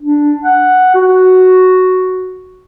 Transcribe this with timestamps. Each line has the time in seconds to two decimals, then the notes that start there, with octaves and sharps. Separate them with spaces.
0.01 D4
0.43 F#5
0.95 F#4